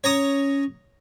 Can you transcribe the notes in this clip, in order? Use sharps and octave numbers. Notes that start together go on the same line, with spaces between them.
C#4 C#5 A#5 D#6